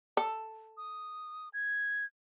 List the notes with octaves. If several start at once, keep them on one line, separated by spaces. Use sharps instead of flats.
A4
D#6
G#6